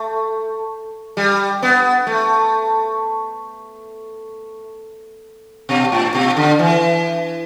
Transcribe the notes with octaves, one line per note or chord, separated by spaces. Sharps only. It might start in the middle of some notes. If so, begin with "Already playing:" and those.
Already playing: A3
G3
B3
A3
B2
A2
B2
D3
E3